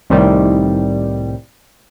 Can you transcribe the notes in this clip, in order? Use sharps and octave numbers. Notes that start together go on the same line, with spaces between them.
C2 A2 C3 D#3 G3